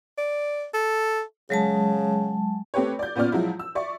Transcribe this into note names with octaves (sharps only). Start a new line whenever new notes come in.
D5
A4
C#3 F#3 G#3 A5
A3 C4 G4 B4 C#5
D5 G6
A#2 B3 C#4 F4 D5 F6
F3 F#3 G#3 E4
E6
D5 E5 C#6